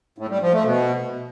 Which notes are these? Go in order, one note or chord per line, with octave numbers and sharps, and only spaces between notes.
A2
G3
F3
A3
B2